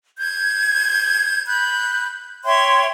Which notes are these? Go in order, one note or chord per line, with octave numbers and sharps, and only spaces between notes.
G6 G#6
B5 F#6 G6
C#5 E5 G5 C6